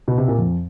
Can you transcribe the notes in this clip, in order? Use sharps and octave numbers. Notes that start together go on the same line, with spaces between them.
B2
C3
A#2
F2